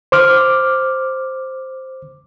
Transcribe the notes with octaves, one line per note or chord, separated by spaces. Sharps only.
C5 D6 F6